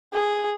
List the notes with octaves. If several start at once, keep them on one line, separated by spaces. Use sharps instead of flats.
G#4